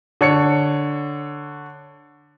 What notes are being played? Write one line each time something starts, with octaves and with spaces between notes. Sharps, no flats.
D3 C#5 C#7